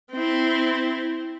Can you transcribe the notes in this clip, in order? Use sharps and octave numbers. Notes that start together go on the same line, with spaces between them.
C4 E4